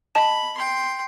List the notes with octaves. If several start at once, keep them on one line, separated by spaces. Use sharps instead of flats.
D#5 A5 B5 E7
G5 C6